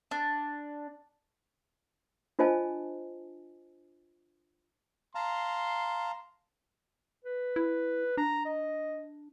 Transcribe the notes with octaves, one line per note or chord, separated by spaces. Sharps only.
D4
D4 F4 C5 D#5 G#5 A5
F5 A5 A#5 C6
B4
E4
D4 A#5
D#5